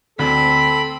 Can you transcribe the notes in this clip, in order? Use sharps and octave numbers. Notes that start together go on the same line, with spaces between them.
D2 C4 A4 B5